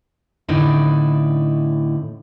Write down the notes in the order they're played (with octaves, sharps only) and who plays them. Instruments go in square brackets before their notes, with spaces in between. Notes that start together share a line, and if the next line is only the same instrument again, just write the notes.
[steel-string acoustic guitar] A2 D3 C4 C#4 D#4 E4